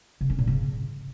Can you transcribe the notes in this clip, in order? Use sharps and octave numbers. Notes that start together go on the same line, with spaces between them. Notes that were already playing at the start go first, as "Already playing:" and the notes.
C#3
C#4
A#2
C#3